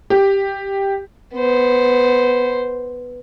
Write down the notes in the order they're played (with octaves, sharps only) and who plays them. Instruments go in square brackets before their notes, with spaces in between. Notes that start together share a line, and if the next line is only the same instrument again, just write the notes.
[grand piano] G4
[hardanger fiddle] B3 C5